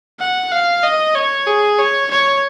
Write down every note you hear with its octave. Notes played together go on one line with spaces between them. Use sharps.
F#5
F5
D#5
C#5
G#4
C#5
C#5